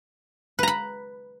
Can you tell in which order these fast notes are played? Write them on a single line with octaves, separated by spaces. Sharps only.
B4 A#5 B5